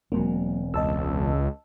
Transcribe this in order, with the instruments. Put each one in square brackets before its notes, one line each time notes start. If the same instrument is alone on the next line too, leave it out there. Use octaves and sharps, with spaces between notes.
[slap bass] E1 G#3 C4 [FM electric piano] F#3 A#3
[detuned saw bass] C#2 [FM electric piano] D#5 A5 E6